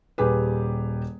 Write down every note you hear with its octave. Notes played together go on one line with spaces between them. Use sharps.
D#1 G4 G#4 B4